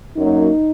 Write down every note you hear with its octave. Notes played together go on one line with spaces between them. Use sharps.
F#2 F#3 A#3 D#4